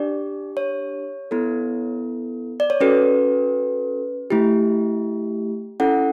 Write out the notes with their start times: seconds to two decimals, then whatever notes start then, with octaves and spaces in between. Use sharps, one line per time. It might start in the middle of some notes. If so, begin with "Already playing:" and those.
Already playing: D4 G4 D5
0.57 C#5
1.31 B3 E4 A4
2.60 D5
2.70 C#5
2.81 C#4 F#4 A4 B4
4.30 A3 E4 G4
5.80 C#4 E4 A4 F#5